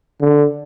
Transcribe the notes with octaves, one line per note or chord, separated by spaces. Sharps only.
D3